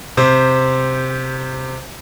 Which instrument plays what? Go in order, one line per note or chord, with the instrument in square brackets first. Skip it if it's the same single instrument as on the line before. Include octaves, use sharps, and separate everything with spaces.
[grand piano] C3 C5